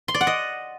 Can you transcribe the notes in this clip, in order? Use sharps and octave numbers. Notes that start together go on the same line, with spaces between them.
C6
D5
F#5
D#5